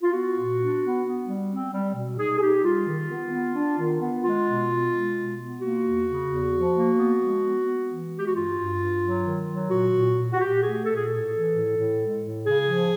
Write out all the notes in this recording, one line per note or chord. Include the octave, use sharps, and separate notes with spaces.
F4
B3 F#4
A#2
D4
B3
B3
G3
C4
G3
B2
D#4 G#4
G#4
D#4 G4
G3 F4
D#3
B3
B3
D4
D#3
B3
G#3 F4
B2
B3
G#3
B2
B3
A#3 F#4
E2
C#3
E2
F3
A#3
B3
G#3
B3
B3
E3
G#3
G4
F#4
G2 F4
G2
G2
F#3
D#3
F#3
A#2 F#4
A#2
A#2
F#4
A#2 G4
A3 G#4
A#2 A4
G#4
A2 A4
E3
A2
A2
G#3
A2
C#3 G#4
F3